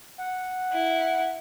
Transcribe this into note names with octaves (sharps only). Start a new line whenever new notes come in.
F#5
E4